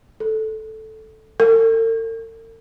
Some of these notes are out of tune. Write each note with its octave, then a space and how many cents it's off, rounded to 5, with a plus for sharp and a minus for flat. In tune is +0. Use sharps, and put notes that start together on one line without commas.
A4 -5
A4 +45